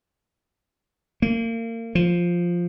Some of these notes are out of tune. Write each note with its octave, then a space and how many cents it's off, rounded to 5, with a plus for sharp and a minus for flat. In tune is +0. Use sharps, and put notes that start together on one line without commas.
A#3 -35
F3 +0